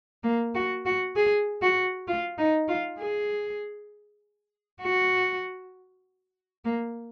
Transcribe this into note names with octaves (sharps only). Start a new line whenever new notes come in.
A#3
F#4
F#4
G#4
F#4
F4
D#4
F4
G#4
F#4
A#3